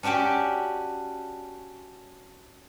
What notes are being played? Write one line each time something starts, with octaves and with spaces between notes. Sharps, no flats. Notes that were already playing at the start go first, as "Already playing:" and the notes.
C#4 D4 F#4 G4 G5